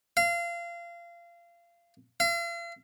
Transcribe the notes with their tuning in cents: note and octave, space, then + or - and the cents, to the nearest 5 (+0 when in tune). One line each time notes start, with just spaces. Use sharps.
F5 -25
F5 -40